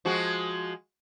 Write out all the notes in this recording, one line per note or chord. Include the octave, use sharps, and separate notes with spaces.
F3 G#3 F#4